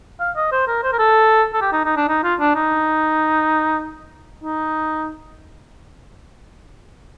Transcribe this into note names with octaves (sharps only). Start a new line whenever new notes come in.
F5
D#5
C5
A#4
C5
A#4
A4
A4
G4
D#4
D#4
D4
D#4
F4
D4
D#4
D#4